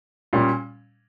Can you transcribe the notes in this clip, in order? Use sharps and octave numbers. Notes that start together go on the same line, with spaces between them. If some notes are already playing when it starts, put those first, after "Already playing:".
A#2 G3 C#4